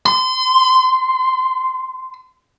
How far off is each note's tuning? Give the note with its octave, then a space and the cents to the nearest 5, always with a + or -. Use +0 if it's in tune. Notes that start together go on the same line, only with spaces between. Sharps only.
C6 -30